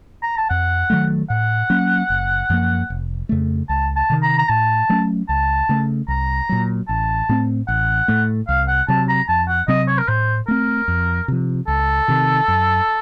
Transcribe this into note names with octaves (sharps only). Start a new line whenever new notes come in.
A#5
A5
F2 F#5
D#3 F#3 A3
A2 F#5
F#3 A#3 C#4
F#1
F#2 F3 A#3
F1
F2 C#3 A3
C#2 A5
A5
C3 D#3
A#5
A#5
A2 A5
F#3 A3 C#4
C#2 A5
C#3 A3
C2 A#5
A#2 F#3
A1 A5
A2 A3 C4
A1 F#5
A2 A3
C2 F5
F#5
C3 F#3 A5
A#5
F2 A5
F#5
C3 F#3 C4 D#5
C#5
A#4
A2 C5
A3 C4 A#4
F2
C3 F3
C#2 A4
C3 D#3
F#2